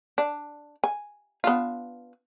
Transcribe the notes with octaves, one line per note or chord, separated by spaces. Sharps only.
D4
G#5
B3 D4 F4